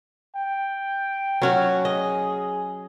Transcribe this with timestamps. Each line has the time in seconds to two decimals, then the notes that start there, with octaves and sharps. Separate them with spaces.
0.36 G5
1.42 F#3 C#4 F#4
1.85 G#4 D#5